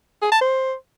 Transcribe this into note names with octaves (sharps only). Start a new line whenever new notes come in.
G#4
A5
C5